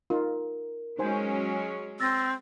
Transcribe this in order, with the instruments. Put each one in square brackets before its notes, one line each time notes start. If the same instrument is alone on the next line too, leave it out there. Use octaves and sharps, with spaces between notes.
[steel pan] D#4 F4 [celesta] A#4
[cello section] F#3 G#3 C#4 [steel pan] D#4 C5 G#5
[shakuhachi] C4 [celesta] E6 A6 A#6